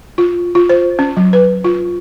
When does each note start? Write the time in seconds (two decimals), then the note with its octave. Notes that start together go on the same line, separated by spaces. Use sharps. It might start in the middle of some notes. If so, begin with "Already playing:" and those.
0.18 F4
0.55 F4
0.69 C5
0.99 C#4
1.17 F#3
1.33 B4
1.64 F4